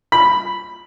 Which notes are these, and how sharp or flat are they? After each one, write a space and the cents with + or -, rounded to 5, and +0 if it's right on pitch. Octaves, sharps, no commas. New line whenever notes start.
B5 +0